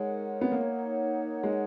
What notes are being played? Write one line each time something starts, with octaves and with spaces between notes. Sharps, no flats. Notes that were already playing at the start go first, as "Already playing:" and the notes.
Already playing: G#3 D#4 A#4 C#5 F#5
B3
A#3
G#3